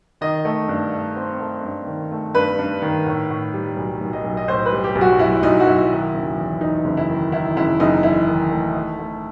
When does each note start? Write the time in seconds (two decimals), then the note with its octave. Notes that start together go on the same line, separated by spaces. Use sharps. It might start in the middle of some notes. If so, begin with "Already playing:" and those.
0.21 D#3 D#5
0.45 A3
0.68 G2
0.92 A3
1.16 C4
1.40 A3
1.64 G2
1.87 D#3
2.11 A3
2.34 G2 B4
2.59 G2
2.82 D#3
3.06 A2
3.30 A2
3.54 G3
3.76 B1
4.01 B1
4.13 D#5
4.24 B1
4.37 D#5
4.48 A2 C5
4.66 B4
4.72 G3
4.84 G4
4.95 B1
5.01 F#4
5.19 B1 E4
5.43 B1 D#4
5.60 F#4
5.66 B1 E4
5.91 D#3
6.14 F#1
6.37 E2
6.61 E2 D#4
6.85 F#1
6.97 E4
7.09 D#3
7.32 D#3 E4
7.56 F#1 E4
7.80 F#1 D#4
8.03 E2 E4
8.27 D#3
8.51 A3
8.75 A3
8.99 A3